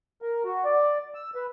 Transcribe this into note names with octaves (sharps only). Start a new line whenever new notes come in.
A#4
F#4
D5
E6
B4